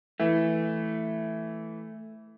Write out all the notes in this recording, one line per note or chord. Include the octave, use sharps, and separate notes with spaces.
E3 A3